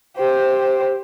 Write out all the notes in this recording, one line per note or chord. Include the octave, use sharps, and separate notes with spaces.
G4 C5